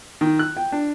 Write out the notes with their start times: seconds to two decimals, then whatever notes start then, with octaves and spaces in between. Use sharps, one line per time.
0.21 D#3
0.39 F#6
0.57 G5
0.72 D4